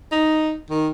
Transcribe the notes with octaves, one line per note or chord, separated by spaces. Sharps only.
D#4
D#3